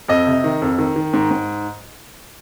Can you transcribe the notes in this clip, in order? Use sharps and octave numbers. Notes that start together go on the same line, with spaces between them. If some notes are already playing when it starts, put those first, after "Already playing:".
F2 D#5
C3
D#3
F2
D#3
D#3
G#2
G#2